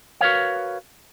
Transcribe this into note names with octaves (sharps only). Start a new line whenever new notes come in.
F#4 A#4 B4 C#5 F5